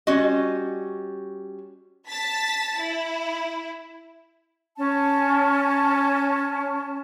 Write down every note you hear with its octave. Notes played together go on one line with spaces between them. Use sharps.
G3 C#4 F#4 D#5
A5 A6 B6
E4
C#4 A5